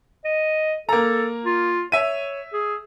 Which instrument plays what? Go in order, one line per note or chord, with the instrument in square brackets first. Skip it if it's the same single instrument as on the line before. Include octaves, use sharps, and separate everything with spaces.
[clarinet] D#5
[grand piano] A#3 A#5 [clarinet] A4
[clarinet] F4
[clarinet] C#5 [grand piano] E5 D#7
[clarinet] G#4